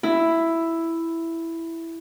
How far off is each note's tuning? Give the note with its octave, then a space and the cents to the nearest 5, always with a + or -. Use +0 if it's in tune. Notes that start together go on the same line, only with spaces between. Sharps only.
E4 +5